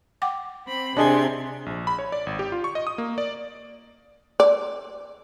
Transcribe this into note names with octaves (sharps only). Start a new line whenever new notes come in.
F#5 G5 D6
C4 B5
C3 D4 G#4 D#5 G#5 A5 C6 G#6
A#1
B5
C#5
D5
G#1
G4
F4
C#6
D#5
D#6
A#3
D5
D5